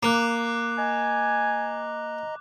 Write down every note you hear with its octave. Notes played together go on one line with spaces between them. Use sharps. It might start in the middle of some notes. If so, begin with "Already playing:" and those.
A#3 D6 F#6
D#5 G#5 A#5